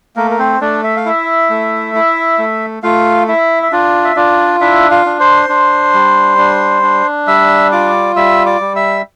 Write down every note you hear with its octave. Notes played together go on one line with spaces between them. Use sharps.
A3 A#3 A#4
A#4
C4 C5
A3 D4 D5
E5
F5
E4 E5
A3
E4
A3
A3 F4 F5
E4 E5
E5
D4 F4 D5
E5
D4 F4 D5
D4 E4 E5
F4 F5
D4
C5 C6
D4
G3
D4
D4
G3 E5 E6
F4 D5 D6
G3 E5 E6
D5 D6
G3
E5 E6